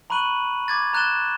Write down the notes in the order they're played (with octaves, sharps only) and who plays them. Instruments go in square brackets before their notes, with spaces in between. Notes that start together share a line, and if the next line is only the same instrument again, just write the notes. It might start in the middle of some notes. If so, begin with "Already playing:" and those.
[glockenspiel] A#5 B5 C#6 F#6 D#7 F#7
D6 G#6 A6
A#5 F#6 A6 E7 G7